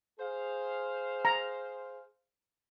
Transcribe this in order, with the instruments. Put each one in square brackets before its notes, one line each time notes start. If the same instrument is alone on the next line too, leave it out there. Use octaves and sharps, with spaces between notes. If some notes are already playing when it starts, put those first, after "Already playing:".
[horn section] G#4 C5 F5
[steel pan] A#5